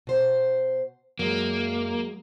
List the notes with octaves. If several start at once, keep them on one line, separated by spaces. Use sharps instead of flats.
B2 C5
F#2 F#3 G#3 A#3